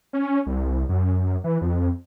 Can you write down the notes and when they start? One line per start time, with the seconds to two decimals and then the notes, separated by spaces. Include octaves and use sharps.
0.13 C#4
0.46 C2
0.89 F#2
1.44 E3
1.61 F2